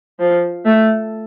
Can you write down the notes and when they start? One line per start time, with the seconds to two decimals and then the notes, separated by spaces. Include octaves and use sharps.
0.20 F3
0.65 A3